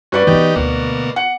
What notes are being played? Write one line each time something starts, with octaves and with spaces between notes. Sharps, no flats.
G2 C#4 F#4 B4 D5
E3 B3 D#4 G4
D2 B2 A#3 D#4
F#5